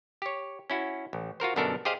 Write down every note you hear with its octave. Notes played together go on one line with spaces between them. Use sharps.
G4 C#5
C#4 E4 F#4
A1
F4 F#4 A#4 C5
G1 F#2 B2 D4 A4 A#4
G4 G#4 C5 D#5 F5